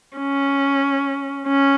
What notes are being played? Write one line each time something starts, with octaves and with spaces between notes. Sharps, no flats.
C#4
C#4